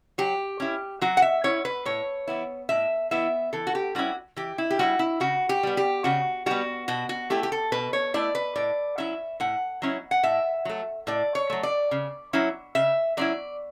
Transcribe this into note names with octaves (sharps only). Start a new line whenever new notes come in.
F#3 G4
C#4 E4
F#3 F#4
F#5
E5
C#4 E4 C#5
B4
A2 C#5
E3 B3 E4
A2 E5
E3 B3 E4 E5
E3 A4
F#4
G4
G3 C#4 E4 F#4
E3 G4
E4
G4
G3 C#4 E4 F#4
E4
C#3 F#4
G4
G3 B3
G4
C#3 F#4
G3 B3 F#4
B2 F#4
F#4
A3 E4 G4
G4
A4
B2 B4
C#5
A3 E4 D5
B4
A2 D5
F#3 C#4 E4 E5
A2 F#5
F#3 C#4 E4
F#5
A2 E5
F#3 A3
A2 D5
C#5
F#3 A3
D5
C#3
F#3 C#4 E4
C#3 E5
F#3 C#4 E4 D5